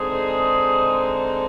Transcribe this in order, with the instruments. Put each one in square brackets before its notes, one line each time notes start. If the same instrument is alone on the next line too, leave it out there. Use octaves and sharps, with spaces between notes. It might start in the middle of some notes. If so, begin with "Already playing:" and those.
Already playing: [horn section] D3 G#3 C4 D#4 G#4